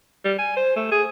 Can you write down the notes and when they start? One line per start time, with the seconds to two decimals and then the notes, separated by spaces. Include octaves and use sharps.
0.25 G3
0.39 G#5
0.57 C5
0.76 A3
0.92 G#4